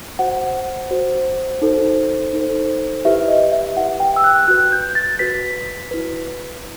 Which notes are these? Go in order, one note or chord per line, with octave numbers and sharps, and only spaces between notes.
F#4 C5 F#5
F#4 C5
D#4 A4 C5
D#4 A4 C5
E4 G4 B4 E5
D#5
E5
E4 G4 B4 F#5
G5
E6
F#6
F#4 B4 F#6
G6
A6
F#4 B4 B6
E4 B4